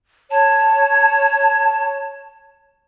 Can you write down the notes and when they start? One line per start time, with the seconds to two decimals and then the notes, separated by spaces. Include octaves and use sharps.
0.31 C#5 A5